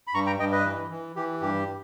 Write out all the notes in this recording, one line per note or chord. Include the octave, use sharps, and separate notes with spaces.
B5
G2 A#5 C#6
G5 A#5
G2 D#5 G5
B4 D#5
E3
E3
E3 G4
G2 G4